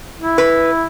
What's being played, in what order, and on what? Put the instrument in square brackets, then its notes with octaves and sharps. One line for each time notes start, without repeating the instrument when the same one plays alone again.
[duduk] E4
[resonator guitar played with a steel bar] B4